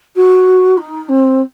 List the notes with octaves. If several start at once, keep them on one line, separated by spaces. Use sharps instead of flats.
F#4
D#4
C4